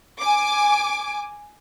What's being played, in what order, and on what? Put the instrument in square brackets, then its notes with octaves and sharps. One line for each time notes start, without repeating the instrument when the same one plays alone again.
[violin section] G#5 D6